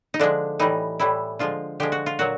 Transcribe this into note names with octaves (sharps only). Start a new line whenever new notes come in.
D#4
D3 F3 G#3 D4
A2 E3 G3 D#4
A2 E3 G3 E4
D3 F3 G#3 F4
D3 F3 G#3 G4
F#4
F4
A#2 F#3 F#4